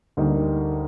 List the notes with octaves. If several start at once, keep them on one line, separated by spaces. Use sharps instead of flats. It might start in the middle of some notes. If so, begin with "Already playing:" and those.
D2 D3 G3 A#3 D#4